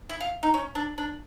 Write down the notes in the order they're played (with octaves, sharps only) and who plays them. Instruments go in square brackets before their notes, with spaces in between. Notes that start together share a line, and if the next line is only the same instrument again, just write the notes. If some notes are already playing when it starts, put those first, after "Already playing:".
[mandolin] E4
F4
D#4
C#4
D4
D4